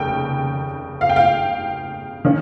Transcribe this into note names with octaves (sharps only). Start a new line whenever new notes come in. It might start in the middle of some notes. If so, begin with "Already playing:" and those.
Already playing: F1 D#2 C#3 G5
F5
G5
F5
D#3 A#3 C#4